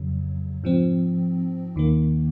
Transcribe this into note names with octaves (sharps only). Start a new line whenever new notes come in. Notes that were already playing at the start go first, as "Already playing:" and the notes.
Already playing: F2 C#3 F#3
G#2 F3 C4
D#2 D#3 A#3